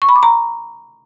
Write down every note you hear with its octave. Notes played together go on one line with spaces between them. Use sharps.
C#6
B5
D6
A#5